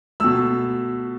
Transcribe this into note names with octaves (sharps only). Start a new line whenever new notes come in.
B2 A3 E6